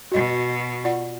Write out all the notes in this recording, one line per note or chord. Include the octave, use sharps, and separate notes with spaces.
B2 F#4 D#5
F4 D5 F#5